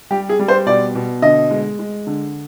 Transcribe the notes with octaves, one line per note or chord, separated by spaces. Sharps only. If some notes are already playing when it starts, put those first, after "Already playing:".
G3 G4
G#4
G3
C5
B2 D5
B2
D3 D#5
G#3
G#3
D3